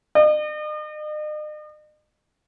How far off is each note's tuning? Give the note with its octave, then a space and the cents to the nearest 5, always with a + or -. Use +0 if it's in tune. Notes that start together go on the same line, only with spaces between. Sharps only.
D#5 -45